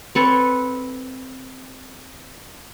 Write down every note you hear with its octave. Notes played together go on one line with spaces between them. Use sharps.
C4 A4 B4 C#5